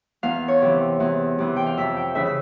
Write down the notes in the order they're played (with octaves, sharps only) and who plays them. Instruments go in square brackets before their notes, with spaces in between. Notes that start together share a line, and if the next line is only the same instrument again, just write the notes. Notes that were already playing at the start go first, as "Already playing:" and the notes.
[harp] E2 F5
C#5
C3 E3
E2
C3 E3
G5
F5
F2 E5
G5
C#3 E3 E5
E5